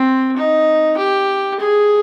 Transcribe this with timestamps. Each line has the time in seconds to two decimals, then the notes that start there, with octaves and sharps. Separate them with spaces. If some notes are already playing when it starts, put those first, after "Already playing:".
Already playing: C4
0.37 D#4
0.97 G4
1.59 G#4